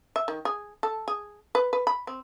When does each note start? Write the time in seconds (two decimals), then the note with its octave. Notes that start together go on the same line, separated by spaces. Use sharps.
0.16 E5
0.28 D#3
0.45 G#4
0.83 A4
1.08 G#4
1.55 B4
1.73 B4
1.87 B5
2.07 C4